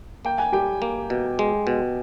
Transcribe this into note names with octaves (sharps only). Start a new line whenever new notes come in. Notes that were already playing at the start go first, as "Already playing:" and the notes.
A#3 G5
G#5
G3 G4 G5
A#3
B2
G#3
B2